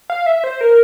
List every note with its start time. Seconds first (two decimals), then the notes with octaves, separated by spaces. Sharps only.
0.10 F5
0.26 E5
0.44 C5
0.61 A#4